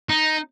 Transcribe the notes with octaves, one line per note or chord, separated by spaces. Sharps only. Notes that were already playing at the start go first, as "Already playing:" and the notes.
D#4